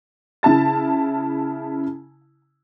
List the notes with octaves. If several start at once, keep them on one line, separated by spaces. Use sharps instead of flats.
C#3 E4 A5 A6